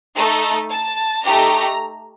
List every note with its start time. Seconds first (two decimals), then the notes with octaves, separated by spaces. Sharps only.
0.16 A3 D#4 A4
0.70 A5
1.24 A3 D#4 G4 A#5